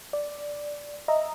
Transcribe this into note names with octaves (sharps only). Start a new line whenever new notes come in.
D5
D#5 E5 A#5